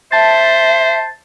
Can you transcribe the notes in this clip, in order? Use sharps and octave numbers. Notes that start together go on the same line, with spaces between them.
C5 E5 A5 A6